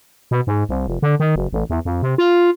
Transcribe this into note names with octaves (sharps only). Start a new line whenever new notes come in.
B2
G#2
C2
F1
D3
D#3
F#1
A1
E2
F2
C3
F4